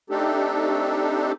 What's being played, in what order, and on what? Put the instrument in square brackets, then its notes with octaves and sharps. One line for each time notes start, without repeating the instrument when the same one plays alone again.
[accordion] A3 C4 D4 D#4 G4 A4